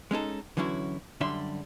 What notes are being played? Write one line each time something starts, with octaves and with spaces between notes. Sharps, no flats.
G#3 C#4 D#4 A4
D3 E3 F#3 C#4 E4 F#4
F#2 D3 G3 D4 E5 C6